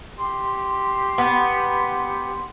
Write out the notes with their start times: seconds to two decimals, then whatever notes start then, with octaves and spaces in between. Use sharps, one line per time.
0.18 G4 C6
1.18 B3